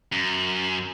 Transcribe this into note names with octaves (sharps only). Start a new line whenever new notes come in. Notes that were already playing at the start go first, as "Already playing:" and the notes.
F#2